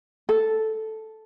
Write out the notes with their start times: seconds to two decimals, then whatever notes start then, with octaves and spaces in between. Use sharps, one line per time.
0.29 A4